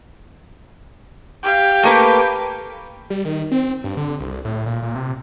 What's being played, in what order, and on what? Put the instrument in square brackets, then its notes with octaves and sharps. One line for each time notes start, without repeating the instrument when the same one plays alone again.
[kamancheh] G4 F5
[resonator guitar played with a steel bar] A3 A#3 B4
[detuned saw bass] G3
D#3
C4
G2
D3
C2
A2
A#2
A#2
C3